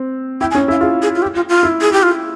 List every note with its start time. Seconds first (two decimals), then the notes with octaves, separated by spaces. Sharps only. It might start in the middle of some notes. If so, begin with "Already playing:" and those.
Already playing: C4
0.41 E4 G5
0.51 G#5
0.55 C#4
0.68 E4
0.71 F5
0.81 F4 G#4
1.02 G#4
1.16 F4
1.22 G4
1.36 F4
1.49 F4
1.63 E4
1.82 G#4
1.93 G4
2.03 F4